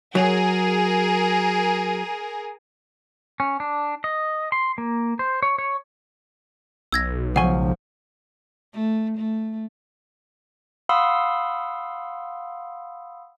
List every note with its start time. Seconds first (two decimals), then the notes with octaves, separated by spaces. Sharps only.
0.15 F#3 G#4 A#4
3.40 C#4
3.60 D4
4.04 D#5
4.52 C6
4.78 A#3
5.19 C5
5.43 C#5
5.58 C#5
6.92 B1 E6 G#6 A#6
7.36 C#2 F3 F#5 G#5 C#6
8.73 A3
9.18 A3
10.89 F5 F#5 B5 C6 D#6 E6